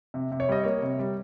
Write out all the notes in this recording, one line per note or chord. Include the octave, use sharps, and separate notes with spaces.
C3
C3
C#5
G3 D#5
A#3 C#5
C3
G3